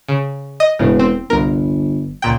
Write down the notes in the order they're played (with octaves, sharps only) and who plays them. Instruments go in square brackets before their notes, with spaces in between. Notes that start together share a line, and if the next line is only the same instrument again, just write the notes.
[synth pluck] C#3
D#5
[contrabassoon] E1 [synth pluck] A2 C#3
[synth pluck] C4
[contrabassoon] G1 [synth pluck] C2 A#4
[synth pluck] C#2 A#2 G5